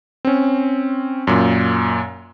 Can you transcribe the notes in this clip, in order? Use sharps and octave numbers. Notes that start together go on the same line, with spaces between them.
C4 C#4
F#2 A#2